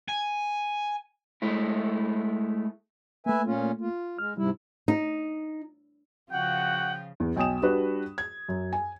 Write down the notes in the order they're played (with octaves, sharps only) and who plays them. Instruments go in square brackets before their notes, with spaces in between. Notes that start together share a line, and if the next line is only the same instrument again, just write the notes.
[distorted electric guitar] G#5
[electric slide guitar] G#3 A3 E4
[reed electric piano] A3 A#3 [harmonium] B4 E5 G#5
[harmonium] A#2 C#4 F4
F4
[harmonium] G#3 [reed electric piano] F6
[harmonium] G#2 C3 E4 [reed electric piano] G3
[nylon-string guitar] D#4
[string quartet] C#3 F3 F4 [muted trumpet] F#4 [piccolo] F#5 [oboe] G5
[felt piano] E2
B1 G5 G#5 D#6 E7
G3 D4 F#4 B4
G#6
F#2
G#5